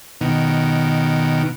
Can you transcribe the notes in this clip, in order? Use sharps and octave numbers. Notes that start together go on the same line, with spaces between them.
B2 D#3